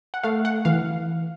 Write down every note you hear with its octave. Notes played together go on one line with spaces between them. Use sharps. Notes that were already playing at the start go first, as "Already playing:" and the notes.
F#5
A3 F5
F#5
E3 F5